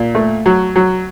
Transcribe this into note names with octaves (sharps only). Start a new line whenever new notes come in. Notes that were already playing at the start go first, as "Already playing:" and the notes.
Already playing: A#2
A3
F#3
F#3